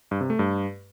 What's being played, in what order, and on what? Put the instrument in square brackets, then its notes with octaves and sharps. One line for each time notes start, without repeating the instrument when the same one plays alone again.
[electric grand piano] G2
C3
A3
G2